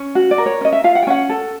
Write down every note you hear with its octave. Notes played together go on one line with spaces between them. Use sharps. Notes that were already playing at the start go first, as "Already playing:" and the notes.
Already playing: C#4
F#4
D5
A#4
C#5
C#4 D#5
E5
F4 F5
F#5
G5
C#4 F#5
A4